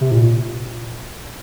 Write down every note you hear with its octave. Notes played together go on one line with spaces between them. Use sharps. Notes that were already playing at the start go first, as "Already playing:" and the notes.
C3
A2
A#2